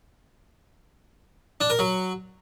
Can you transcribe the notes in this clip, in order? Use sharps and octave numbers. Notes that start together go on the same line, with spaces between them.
D4
A#4
F#3